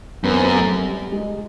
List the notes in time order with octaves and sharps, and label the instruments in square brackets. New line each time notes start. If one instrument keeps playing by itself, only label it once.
[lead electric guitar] F#2 [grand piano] B3
[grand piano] C4
B3
A3
G3
G#3